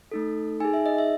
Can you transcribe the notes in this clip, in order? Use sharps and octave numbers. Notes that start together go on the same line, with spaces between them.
A3 D#4 A4
D#4 G#4 G#5
E5
D#5
E5